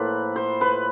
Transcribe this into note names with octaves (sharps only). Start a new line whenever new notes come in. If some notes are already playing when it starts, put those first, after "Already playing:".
Already playing: A2 F3 A#3 B4
C5
B4